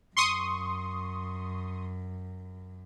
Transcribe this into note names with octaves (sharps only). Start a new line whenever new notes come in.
F#2 C6 C#6 D#6